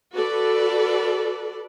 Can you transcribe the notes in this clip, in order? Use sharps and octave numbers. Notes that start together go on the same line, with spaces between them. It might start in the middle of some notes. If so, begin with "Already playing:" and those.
F#4 A4 B4 D5